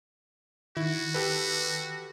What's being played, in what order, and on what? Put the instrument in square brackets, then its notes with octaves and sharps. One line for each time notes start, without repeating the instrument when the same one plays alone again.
[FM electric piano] D#3 [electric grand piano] E4 [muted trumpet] F#4
[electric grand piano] G4 A4 B4